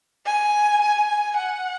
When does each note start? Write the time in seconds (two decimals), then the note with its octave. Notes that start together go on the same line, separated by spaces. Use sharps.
0.26 G#5
0.82 G#5
1.37 F#5